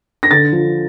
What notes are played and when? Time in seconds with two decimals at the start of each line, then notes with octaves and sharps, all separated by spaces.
0.23 A#6
0.31 D3 A6
0.52 F3